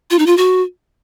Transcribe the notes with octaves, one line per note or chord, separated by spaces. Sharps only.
F4
D#4
F4
F#4